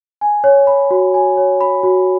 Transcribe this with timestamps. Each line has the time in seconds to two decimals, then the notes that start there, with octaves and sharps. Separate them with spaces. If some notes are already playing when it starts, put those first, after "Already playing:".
0.21 G#5
0.44 C#5
0.67 B5
0.91 F#4
1.14 G#5
1.37 C#5
1.61 B5
1.83 F#4